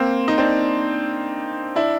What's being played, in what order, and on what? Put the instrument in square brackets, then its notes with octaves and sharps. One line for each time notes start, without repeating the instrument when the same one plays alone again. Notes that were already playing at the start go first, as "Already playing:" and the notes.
Already playing: [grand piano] A#3 C4
D#4
C4 D4
D4 E4